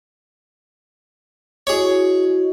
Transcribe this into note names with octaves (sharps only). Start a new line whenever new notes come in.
E4 F#4 G#4 C#5 D#5